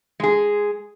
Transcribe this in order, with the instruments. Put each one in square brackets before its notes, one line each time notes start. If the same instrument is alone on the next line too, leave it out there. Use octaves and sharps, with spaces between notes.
[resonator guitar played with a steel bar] G#3 G#4